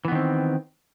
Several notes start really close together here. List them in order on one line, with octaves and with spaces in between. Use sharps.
E3 B3 D#3 C4